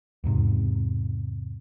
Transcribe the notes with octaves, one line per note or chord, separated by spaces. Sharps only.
E2 G#2 C3